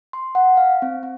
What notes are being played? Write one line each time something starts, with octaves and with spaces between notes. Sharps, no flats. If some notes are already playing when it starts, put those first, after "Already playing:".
C6
F#5
F5
C4
C4